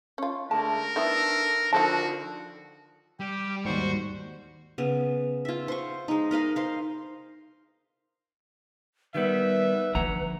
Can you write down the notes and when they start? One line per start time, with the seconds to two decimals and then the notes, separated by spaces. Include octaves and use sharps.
0.18 C#4 F4
0.51 D3 G#3 A3 A#4 A5
0.96 D#3 B3 D4 E4 A4
1.73 D3 D#3 F3 F#4 A4 A5
3.20 G3 G4
3.65 D#2 G#2 G3 F#4 C5 C#6
4.78 C#3 B3
5.45 F4 E5
5.68 C5 C#6
6.08 G#3 D#4
6.31 A#4 D#5 F5 B5
6.56 C5 F5
9.15 D#3 G3 B3 B4 E5
9.95 D3 F3 F#5 A#5